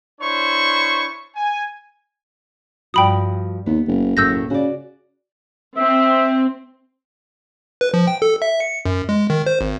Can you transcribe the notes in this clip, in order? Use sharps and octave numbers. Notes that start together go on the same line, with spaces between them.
D4 E4 C5 C#5 C#6
G#5
G2 F3 F#4 G5 B5 D#6
D#2 B3
F#1
F#1 D#2 A2 A3 E6 G6 A#6
C#3 F#4 D5
C4 E5
B4
F3
G5
A4
E5
C#7
F#2
G#3
D#3
C5
G#1